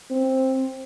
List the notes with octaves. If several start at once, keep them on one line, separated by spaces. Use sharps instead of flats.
C4